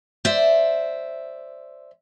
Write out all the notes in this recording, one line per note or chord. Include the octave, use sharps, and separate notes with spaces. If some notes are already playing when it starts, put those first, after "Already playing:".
C5 D5 E5